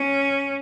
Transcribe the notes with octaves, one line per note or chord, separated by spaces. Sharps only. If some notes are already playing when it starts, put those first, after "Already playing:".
Already playing: C#4